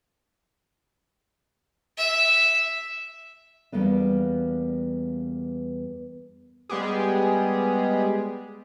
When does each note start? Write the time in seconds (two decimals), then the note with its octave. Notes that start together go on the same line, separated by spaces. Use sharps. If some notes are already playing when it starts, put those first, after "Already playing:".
1.98 E5
3.72 E2 G3 A#3 B3 D4
6.69 G3 G#3 B3 G4 G#4